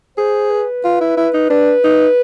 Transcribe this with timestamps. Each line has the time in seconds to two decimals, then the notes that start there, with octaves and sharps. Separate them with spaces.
0.18 G#4 C5
0.50 B4
0.84 F4
1.01 E4
1.17 E4
1.34 D#4
1.50 D4 B4
1.84 D#4